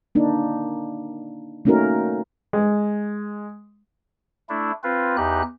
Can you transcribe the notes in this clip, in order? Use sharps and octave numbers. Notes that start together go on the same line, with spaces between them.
A#3 D4 D#4
A3 A#3 C#4 D#4 F#4 A#4
G#3
A3 D4 E4
C4 F4 B4
E2 D#4 G4 F#6